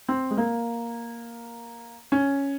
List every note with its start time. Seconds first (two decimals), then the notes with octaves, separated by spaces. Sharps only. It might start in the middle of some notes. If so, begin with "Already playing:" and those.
0.08 C4
0.31 G#3
0.38 A#3
2.12 C#4